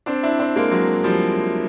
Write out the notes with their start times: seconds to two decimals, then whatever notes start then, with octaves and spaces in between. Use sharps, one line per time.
0.06 C4 D4
0.23 D4 E4
0.39 C4 D4
0.56 G#3 A#3
0.71 F#3 G#3
1.04 F3 G3